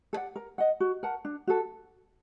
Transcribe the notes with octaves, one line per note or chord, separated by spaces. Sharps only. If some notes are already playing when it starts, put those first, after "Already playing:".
A4 D5 F#5
A#4
D#5 F#5
F#4
A#4 F#5 A5
D4
F#4 A4